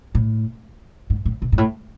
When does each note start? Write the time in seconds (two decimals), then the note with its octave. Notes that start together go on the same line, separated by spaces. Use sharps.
0.15 A2
1.10 G#2
1.25 A2
1.42 B2
1.52 G#2
1.58 A2